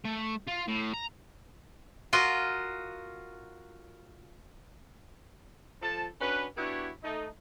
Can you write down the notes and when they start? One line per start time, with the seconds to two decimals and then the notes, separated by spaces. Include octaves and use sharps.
0.05 A3
0.48 F4
0.68 A2
0.94 A#5
2.13 F4 F#4 A#4 D#5
5.82 F3 A4 A5
6.21 C#4 D4 F#4 B4
6.57 B3 D4 E4 F#4 G4 C#5
7.04 A3 D#4